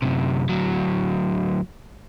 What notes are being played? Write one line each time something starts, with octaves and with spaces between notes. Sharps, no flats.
F#2 C3
D2 F#3